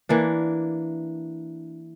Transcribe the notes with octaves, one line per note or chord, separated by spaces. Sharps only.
E3 A#3 D4